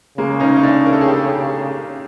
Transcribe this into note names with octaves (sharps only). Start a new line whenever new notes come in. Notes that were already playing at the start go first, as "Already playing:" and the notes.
C#3 G#3 A#3
C#4 D#4
D#4
D4 E4
A#4
A4
G#4
G4 A4